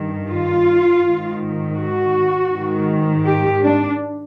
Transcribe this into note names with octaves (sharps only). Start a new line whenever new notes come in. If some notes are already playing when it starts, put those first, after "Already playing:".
Already playing: G2 D#3
F4
G#2 D#3
F#4
G#2 D#3
G4
D4